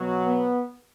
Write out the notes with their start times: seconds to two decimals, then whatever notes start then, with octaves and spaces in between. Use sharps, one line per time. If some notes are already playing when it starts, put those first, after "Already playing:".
Already playing: B2 F#3
0.26 B3